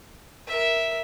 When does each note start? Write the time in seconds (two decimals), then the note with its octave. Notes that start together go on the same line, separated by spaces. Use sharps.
0.47 A#4 E5